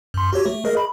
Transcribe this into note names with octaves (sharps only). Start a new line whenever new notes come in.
F#2 C6
F#4 G4 C#5
A3
G#4 A#4 D#5
B5